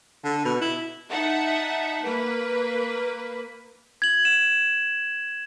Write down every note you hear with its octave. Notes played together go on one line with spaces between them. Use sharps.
D3
B2
E4
D#4 E5 F#5 A5
A#3 B4
G#6 F#7
E7